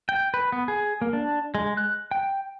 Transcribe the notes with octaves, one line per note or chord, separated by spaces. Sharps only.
G5
B4
B3
G#4
A#3
D4
G#3
F#6
G5